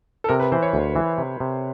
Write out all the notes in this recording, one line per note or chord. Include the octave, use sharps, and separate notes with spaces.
A4
C3 A#4
B4
E3 C5
C#5
D2
E3
C3
C3